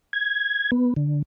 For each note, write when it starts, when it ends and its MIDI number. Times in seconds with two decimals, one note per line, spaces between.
0.13 0.71 92
0.72 0.94 59
0.96 1.22 50